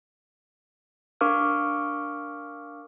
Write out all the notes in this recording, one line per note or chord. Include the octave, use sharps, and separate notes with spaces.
D4 A#4 F5 C#6 D6 F6